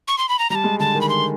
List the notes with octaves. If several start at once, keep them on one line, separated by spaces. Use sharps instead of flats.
C#6
C6
B5
A#5
G3 A5 A#5
G#3
D3 A5
D#3
B5
C6